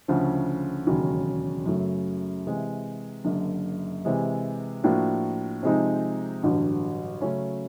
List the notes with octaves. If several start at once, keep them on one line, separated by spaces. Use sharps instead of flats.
D2 C#3 F3
E1 D#2 C#3 F#3
F#2 C#3 F#3 A3
C3 E3 G#3
F#1 F#2 D3
C3 E3 G#3
A2 F3 A#3 D4 F#4
C3 F3 G#3 C4 D#4
A1 G2 D3 F#3
C#3 F#3 A3 C#4